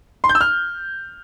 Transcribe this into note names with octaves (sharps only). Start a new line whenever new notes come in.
C6
G6
E6
F6